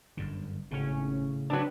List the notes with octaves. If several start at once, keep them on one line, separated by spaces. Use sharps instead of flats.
G1 F#2 D3
G#1 A2 C#3 C#4
F#3 C4 D4 B4